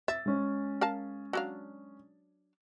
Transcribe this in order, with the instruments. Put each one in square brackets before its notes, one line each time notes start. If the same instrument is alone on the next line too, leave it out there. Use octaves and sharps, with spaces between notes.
[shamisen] E5 [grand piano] A6
[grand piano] G#3 C#4
[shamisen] A#4 F5 A5
F#3 D4 F5